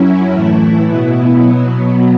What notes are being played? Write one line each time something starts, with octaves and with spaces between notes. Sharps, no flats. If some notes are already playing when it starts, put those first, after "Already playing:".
Already playing: F#2 F#3 C#4 E4
A2 E3 A3 E4
B2 B3 E4
B2 F#3 B3